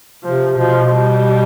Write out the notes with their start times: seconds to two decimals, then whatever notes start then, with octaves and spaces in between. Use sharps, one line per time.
0.24 C3 F3
0.58 B2 F3
0.91 G3